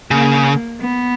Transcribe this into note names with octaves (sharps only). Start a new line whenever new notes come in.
C#3 A#3
B3